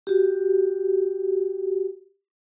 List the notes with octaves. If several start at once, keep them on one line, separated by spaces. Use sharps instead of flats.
F#4 G4